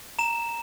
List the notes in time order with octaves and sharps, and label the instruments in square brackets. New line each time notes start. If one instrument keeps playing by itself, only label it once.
[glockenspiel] A#5 E7